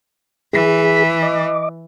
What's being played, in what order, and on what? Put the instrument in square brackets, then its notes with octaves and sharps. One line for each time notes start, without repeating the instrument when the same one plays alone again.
[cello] E3 [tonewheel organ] G#4
[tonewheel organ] D#5 D6